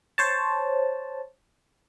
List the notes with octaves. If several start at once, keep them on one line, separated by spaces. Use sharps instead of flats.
C5 C#5 A5